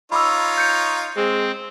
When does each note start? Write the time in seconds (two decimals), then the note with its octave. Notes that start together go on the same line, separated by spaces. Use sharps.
0.12 D#4 F4 C#5 B5 D6 E6
0.58 G6 C#7
1.16 G#3 C4